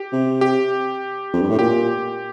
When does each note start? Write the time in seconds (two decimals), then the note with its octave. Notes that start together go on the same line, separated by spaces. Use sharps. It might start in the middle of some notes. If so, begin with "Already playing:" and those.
Already playing: G4
0.12 C3
0.41 G4
1.33 F2
1.42 G2
1.50 A2
1.59 A#2 G4